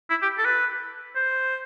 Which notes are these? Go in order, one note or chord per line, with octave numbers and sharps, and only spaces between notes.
E4
G4
A4
B4
C5